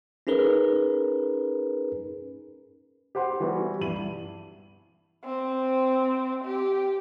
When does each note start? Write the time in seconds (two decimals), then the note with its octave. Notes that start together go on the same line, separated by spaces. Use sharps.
0.27 C#4 D#4 G#4 A#4 B4
3.15 G4 C5 F#5 C6
3.40 E3 G3 B3 F#4
3.81 G2 E4 D#7 F#7
5.25 C4
6.45 G4